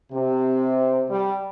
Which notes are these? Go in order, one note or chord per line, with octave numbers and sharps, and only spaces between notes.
C3
G3